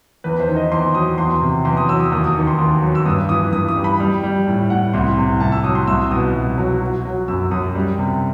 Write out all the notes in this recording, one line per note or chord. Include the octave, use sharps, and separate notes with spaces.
E2 B4
C5
D#3
D#5
E2 C6
F#3 D#6
E2 C6
C3
E2 C6
D#6
F#3 E6
D#6
D#2 D#6
D#6
D#3
C6
D#2
F#3
E6
G2 D#6
E3 D#6
G2 D#6
D#6
G3
B5
G3
G3
A2
A2 F#5
C2 C6
C3
C2 A5
E6
F#3 D#6
C6
C2 E6
B2 D#6
C2
F#3
F#3
F#3
F#2 E6
F#2 D#6
G3
C3